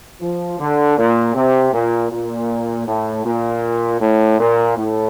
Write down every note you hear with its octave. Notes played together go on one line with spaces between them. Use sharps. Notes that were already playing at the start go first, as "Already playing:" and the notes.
F3
D3
A#2
C3
A#2
A#2
A2
A#2
A2
A#2
A2